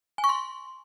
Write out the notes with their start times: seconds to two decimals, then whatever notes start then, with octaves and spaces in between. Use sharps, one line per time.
0.18 G#5
0.24 C#6
0.29 C6